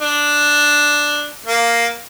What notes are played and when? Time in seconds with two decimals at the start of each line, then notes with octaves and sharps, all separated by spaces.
0.01 D4
1.46 A#3